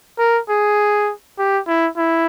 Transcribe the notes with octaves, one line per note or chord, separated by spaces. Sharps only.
A#4
G#4
G4
E4
E4